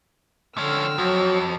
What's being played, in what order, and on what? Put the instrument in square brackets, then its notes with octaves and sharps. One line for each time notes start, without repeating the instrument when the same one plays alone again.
[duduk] D3 [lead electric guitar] F3 C#4 [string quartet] G5 E6 F6
[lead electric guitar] F2 [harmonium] F#3 [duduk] F#4